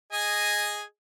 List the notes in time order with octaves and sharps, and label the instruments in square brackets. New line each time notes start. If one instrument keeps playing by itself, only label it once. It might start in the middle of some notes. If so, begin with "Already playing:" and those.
[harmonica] G#4 D#5 G#5